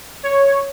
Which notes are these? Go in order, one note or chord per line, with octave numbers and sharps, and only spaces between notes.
C#5